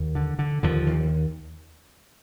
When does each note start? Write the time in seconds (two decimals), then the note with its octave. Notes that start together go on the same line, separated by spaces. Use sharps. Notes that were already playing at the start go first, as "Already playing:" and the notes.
Already playing: D#2
0.15 D3
0.39 D3
0.63 D#2 D3 F3
0.87 D#2